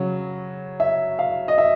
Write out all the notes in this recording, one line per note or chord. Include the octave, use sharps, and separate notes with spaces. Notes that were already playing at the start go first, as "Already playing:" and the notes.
Already playing: C#3 F#3
E5
F5
D#5
E5